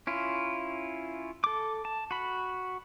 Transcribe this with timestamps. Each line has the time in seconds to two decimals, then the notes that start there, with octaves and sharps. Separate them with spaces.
0.07 C#4 E4 F4
1.44 A4 D6
1.85 A5
2.11 F#4 B5